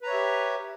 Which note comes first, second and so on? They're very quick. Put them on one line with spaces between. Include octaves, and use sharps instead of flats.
B4 A#5 C#5 E5 G4